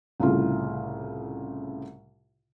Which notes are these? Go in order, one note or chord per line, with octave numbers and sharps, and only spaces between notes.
C2 A2 C#3 F4